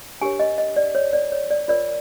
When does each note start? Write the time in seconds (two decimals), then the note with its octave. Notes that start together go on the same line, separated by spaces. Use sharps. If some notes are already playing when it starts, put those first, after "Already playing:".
0.21 D4 G4 A#4 C#5 G#5
0.40 D#5
0.58 D#5
0.76 D5
0.95 C#5
1.13 D5
1.32 C#5
1.51 D5
1.68 F4 A#4 C#5 D5